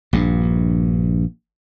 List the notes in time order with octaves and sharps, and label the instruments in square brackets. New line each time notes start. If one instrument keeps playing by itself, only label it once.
[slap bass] A#1 G2